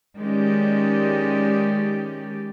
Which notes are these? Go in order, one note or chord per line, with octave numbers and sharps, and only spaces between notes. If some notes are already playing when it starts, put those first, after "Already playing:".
D#3 G#3 C#4 G4 D5